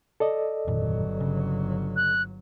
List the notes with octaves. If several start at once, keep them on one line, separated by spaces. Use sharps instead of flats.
A4 D5 D#5
G1 F2 A#2 D#3 F#3
C#3
F#6